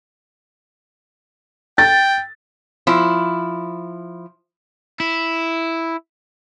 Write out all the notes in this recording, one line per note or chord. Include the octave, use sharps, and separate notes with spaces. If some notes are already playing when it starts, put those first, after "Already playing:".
G5 A6
F3 E4
E4